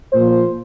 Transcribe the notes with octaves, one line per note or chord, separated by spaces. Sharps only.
A#2 F3 C5